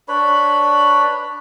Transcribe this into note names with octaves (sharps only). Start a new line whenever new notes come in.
D4 B4 C#5 B5